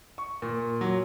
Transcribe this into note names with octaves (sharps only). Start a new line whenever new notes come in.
C#6
A#2
F#3